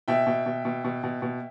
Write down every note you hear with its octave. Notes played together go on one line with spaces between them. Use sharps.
B2 E5 G5
B2
B2
B2
B2
B2
B2